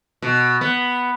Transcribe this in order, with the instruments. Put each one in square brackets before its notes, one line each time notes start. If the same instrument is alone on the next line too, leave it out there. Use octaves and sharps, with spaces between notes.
[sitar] B2
B3